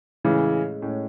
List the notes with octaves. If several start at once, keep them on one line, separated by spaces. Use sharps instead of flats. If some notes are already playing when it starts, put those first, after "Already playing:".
A2 C#3 E3 G#3 C#4
A2 G#3 C#4